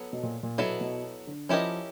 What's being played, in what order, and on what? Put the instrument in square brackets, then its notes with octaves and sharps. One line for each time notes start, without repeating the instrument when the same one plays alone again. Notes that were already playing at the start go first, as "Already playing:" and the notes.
Already playing: [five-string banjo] F#3 B3 A4
[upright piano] B2
A#2
A#2
[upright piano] B2 [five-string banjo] F#3 B3 E4 A4
[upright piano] B2
D3
[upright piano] F3 [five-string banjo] C#4 E4 G4 A#4 D#5